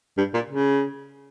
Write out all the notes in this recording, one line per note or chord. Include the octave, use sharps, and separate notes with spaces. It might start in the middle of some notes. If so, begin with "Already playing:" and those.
G2
A#2
C#3